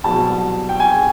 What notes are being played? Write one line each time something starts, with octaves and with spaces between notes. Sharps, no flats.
C2 B2 F#3 A5
G5
G#5